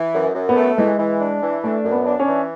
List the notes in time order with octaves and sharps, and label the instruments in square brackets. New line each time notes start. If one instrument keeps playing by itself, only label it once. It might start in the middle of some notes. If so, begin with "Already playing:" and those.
Already playing: [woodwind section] E3
F#2
F#2
[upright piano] B3
[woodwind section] A3
[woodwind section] E3 [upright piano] G#3
[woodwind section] E3
D4
E3
[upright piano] A3 [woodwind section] D4
[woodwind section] F#2
[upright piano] B3
[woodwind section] D4
[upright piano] C#4
[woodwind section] E3